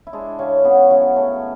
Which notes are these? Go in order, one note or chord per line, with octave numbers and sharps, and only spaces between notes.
E4
G#3 D4
C#3 C#4
C#3 B3
F#3 C#4
A3 C#4